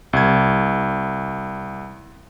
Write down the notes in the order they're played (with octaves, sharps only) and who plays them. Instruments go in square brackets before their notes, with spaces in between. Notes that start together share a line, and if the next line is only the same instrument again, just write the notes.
[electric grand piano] C2 G#6